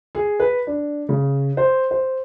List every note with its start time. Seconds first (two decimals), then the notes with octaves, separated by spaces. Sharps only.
0.15 G#4
0.40 B4
0.67 D4
1.09 C#3
1.57 C5
1.91 C5